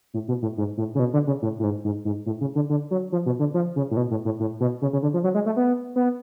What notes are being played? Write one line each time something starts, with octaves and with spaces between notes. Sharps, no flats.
A2
B2
A2
G#2
A2
C#3
B2
D3
C#3
A2
A2
G#2
G#2
G#2
A2
C#3
D3
D3
F#3
F3
B2
D3
F3
C#3
A2
B2
A2
A2
A2
B2
C#3
C#3
D3
F3
F#3
G#3
A3
B3
B3